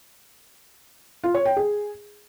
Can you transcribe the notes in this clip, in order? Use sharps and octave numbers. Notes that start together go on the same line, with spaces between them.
F4
C#5
G5
G#4